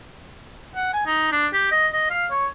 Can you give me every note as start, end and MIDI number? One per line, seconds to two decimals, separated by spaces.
0.75 0.90 78
0.93 1.06 80
1.06 1.27 63
1.32 1.47 62
1.53 1.67 67
1.72 1.88 75
1.93 2.06 75
2.10 2.26 77
2.31 2.47 73